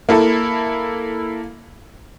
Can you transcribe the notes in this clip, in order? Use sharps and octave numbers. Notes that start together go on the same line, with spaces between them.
A#3 E4 A4